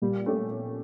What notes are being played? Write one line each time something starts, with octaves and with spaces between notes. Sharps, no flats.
A#2 G3
A3 C#4 G4